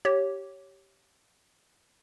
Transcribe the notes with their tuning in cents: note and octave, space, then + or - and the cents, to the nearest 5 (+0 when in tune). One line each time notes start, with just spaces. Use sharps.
G4 -15 C#5 +0